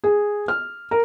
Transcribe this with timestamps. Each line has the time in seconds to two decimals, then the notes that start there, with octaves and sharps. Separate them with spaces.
0.04 G#4
0.48 F6
0.91 A#4